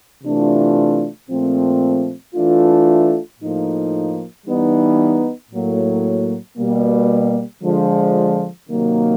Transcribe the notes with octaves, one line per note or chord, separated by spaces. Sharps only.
C3 E3 A3 D4 F4
A#2 F3 A3 C4
E3 A3 D4 F4
A2 F3 A#3 D#4
E3 G3 B3 D#4
A2 F#3 A#3
B2 G3 A#3
D3 F3 G#3
C3 D#3 F#3 A#3